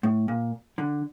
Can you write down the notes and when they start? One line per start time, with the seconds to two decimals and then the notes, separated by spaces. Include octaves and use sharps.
0.03 A2
0.28 A#2
0.78 D3